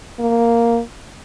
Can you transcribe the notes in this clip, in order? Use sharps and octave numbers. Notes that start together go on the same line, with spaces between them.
A#3